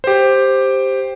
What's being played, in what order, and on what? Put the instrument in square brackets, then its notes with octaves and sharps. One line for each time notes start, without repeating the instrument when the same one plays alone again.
[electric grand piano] G4 C5